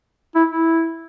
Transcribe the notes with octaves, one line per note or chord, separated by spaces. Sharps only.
E4
E4